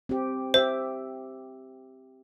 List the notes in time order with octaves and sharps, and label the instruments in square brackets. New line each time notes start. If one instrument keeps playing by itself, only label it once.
[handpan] C4 G4
[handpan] G4 E5 [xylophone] C5